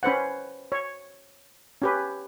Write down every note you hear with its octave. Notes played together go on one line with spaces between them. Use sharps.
C#4 B4 C5 F#5
C#5
C#4 G4 B4